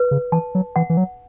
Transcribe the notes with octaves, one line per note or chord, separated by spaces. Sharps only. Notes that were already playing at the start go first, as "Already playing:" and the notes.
Already playing: B4
C#3
E3 A5
F#3
E3 F#5
E3
F#3